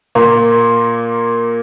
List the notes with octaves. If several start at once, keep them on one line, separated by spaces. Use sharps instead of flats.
A#2 A#3